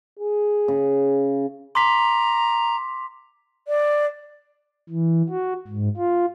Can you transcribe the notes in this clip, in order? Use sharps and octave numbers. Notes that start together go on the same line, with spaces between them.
G#4
C#3
A#5 C6 D6 B6
D5
E3
F#4
G#2
F4